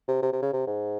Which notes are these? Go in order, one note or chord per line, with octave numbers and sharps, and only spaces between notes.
C3
C3
C3
C#3
C3
G#2